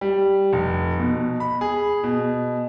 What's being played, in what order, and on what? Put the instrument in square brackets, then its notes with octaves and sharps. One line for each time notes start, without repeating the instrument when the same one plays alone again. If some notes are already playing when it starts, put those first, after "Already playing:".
[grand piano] G3
F1
B2
B5
G#4
B2